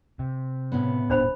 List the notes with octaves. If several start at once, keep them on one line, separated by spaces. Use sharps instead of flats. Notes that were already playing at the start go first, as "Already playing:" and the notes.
C3
A2 C#3 B3
D#1 D4 C5 B5